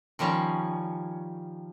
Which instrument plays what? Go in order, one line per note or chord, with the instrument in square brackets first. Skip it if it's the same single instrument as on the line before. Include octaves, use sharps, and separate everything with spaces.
[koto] D#3 F3 G3 C#4